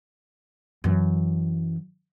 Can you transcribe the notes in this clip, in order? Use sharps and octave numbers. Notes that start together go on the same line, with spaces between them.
F#2 E3